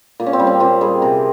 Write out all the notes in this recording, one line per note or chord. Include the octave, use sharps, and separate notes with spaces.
A#2
C#4
C4
G3
C#4
A#2 C4
G3 G#4
C3 A#4